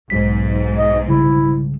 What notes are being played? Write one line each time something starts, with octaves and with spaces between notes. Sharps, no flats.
B1 G#2 B6
D#5
C#3 G3 E4